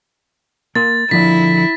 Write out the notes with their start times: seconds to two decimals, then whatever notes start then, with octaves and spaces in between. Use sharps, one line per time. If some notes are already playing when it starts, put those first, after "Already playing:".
0.75 A#3 A#4 C6 A6
1.11 D3 F3 E4 D5 B6